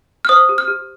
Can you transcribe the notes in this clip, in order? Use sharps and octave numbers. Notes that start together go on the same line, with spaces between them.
F6
C5 D#6
G4
F6
G4